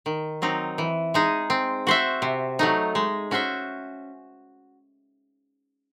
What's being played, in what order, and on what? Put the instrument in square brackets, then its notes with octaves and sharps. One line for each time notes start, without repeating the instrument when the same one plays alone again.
[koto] D#3
F#3 C4 D#4
E3
G#3 D#4 G#4
C4
F#4 C5 E5
C3
F#3 A3 D#4
G#3
C#4 F#4 C5 E5